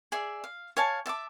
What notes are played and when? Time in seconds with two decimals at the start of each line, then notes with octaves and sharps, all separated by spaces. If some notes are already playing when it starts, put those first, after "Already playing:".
0.12 G#4 D5 E5
0.44 F5
0.77 C#5 F5 G#5 A5
1.06 D5 E5 A5 D6